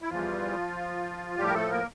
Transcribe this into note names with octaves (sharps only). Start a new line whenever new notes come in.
E4
E2 E3 F3 G3 F4
A2 F3 G3 G4
A#4
A3 A4
A#3 A#4